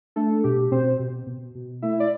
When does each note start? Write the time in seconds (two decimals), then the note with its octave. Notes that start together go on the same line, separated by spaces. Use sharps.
0.16 A3 D4 A4
0.44 B2 G4
0.71 B2 C4 C5
0.99 B2
1.27 B2
1.55 B2
1.82 A3 E4 E5
2.00 D5